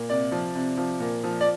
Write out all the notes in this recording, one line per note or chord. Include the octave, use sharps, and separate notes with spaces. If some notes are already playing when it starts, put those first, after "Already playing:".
Already playing: A#2
C3 D5
F3
C3
F3
A#2
F3
D5